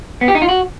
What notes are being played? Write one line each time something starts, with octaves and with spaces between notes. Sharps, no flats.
B3
G4
D#4
F4
F#4